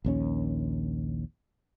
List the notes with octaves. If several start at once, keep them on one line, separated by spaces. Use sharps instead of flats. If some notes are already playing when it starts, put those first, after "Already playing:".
A#1 D#2 C#4